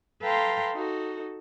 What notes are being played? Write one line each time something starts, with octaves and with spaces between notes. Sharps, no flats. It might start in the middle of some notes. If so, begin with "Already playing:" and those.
A4 B4 F5 G5 A#5 C6
D#4 F#4 A4